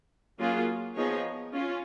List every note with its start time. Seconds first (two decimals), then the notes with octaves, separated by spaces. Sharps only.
0.39 F#3 A#3 C#4 F4 G#4
0.96 F3 B3 D#4 G#4 C#5
1.53 C#4 F4